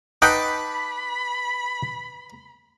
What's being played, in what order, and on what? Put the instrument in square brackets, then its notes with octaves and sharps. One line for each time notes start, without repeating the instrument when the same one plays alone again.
[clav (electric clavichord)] D#4 F#5 G5 [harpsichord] B4 A5 D6 [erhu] B5